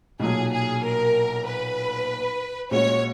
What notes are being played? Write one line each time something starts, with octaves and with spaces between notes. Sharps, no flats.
B1 A#2 F#3 G#4
G#4
A#4
B4
A#1 A#2 G#3 C#4 F#4 C#5